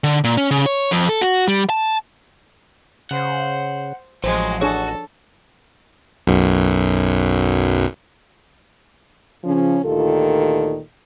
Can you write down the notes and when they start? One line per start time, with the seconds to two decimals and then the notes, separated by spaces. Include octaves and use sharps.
0.04 D3
0.24 A#2
0.37 C#4
0.51 C#3
0.66 C#5
0.91 F2
1.09 A4
1.22 F#4
1.48 G3
1.69 A5
3.11 C#3 C5 F#5
4.24 A1 F3 F#3 G#3 C5
4.61 D4 F#4 G#4 A4 C#5
6.27 B1 F#2
9.44 C#3 F3 C#4
9.84 D2 A#2 D#3 F4 G4 A4